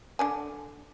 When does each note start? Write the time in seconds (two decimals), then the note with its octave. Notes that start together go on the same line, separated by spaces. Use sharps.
0.19 D3 D4 G#5